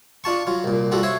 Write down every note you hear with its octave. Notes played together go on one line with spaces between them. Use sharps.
D4 F4 A5 C#6
F#3 F4
C2 A#2
G3 F4 F#4 A4
C5 C#5 E5